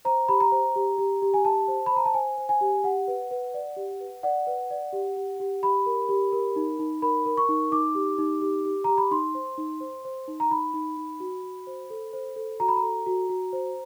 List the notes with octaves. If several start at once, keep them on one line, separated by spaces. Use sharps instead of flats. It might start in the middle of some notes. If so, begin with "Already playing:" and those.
C5 A#5
G4 B5
A#5
C5
G4
G4
G4
G#5
G4 A5
C5
B5
C5
A#5
A5
C5 G#5
C5
G#5
G4
G4 F#5
B4
B4
D5
G4
B4
D5 F#5
B4
D5
G4
G4
G4
G4 B5
A#4
G4
A#4
D#4
D#4
A#4 B5
A#4
C#6
D#4
D#4 D6
G4
D#4
G4
G4
G4 A#5
B5
D#4 C6
C5
D#4
C5
C5
D#4
A#5
D#4 B5
D#4
D#4
F#4
F#4
C5
A4
C5
A4
F#4 A#5
B5
A#5
A4
F#4
F#4
C5